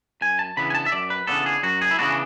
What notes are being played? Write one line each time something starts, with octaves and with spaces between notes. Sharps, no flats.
F#2 G#5
A5
C#3 E3 B3 D4 B5
G#5
A5
E5
F#2 D5
B4
C#3 E3 B3 D4 A4
G#4
F#2 F#4
G#4
E4
C#3 E3 B3 D4 F#4